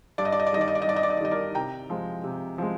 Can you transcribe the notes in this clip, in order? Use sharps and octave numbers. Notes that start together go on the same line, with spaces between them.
G2 D5
D#5
D5
D#5
D5
D#3 G3 D5 D#5
D#5
D5
D#5
G2 D5
D#5
D5
D#5
D5
D#3 G3 D#5
A#4 D5
C3 G5 A#5
F3 G#3
C3
F3 G#3